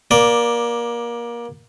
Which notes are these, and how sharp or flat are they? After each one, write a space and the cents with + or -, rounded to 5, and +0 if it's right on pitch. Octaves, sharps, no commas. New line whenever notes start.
A#3 +25 D5 +0